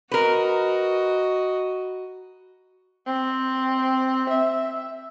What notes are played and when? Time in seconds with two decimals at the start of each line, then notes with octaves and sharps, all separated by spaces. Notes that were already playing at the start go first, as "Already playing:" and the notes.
0.12 F#4 A#4 B4 D#5
3.07 C4
4.31 E5